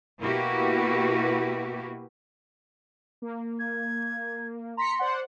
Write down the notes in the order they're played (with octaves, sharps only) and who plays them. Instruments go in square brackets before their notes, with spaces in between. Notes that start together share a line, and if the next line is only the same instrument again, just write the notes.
[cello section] B2 A#3 E4 F#4 G4 B4
[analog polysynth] A#3
[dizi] G#6
[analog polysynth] A#5 B6 C#7 [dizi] C6
[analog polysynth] C5 D5 F#5